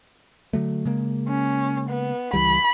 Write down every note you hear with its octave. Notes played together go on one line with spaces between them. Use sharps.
D3 F#3 A3
C#3 G#3 A#3
C#4
B3
C#2 E3 G3 B5